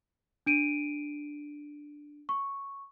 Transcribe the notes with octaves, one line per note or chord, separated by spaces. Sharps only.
D4 D7 D#7
C#6